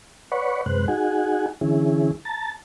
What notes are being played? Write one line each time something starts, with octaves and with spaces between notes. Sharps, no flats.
B4 C#5 D5 F#5 B5 C#6
F#2 C3 G#3 B4 C5 F#6
D#4 F#4 G#4 F#5 G#5
D3 E3 C#4 E4 G#4
A5 A#5 A6